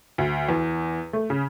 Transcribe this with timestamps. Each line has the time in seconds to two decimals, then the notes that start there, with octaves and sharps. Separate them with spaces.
0.18 D2
0.49 E2
1.13 A3
1.30 C#3